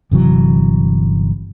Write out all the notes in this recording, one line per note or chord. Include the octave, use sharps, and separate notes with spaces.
G1 C3 E3 F#3